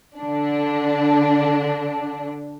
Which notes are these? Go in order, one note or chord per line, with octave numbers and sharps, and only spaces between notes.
D3 D4